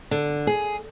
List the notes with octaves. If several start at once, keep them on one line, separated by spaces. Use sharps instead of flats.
D3
G#4